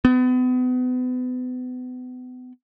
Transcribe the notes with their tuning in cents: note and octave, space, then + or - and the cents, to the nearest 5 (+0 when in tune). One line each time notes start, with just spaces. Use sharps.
B3 +35